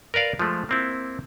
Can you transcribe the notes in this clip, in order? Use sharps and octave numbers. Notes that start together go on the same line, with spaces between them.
A#4 B4 D5 F5
F3 G#3 A3
A#3 C4 E4